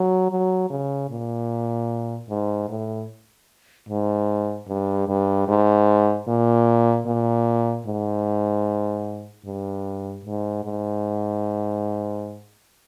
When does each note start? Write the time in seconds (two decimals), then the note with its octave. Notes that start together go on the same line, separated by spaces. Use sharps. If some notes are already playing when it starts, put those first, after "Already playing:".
Already playing: F#3
0.31 F#3
0.70 C#3
1.10 A#2
2.29 G#2
2.69 A2
3.89 G#2
4.68 G2
5.08 G2
5.48 G#2
6.28 A#2
7.06 A#2
7.86 G#2
9.46 G2
10.25 G#2
10.64 G#2